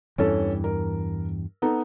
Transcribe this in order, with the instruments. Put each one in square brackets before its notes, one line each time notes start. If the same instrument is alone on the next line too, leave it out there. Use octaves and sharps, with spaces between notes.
[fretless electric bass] E2 G2 E3 [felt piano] C#4 A4
[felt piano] A#4
B3 D#4 A4